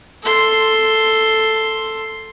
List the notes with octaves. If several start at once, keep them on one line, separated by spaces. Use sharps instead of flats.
A4 C6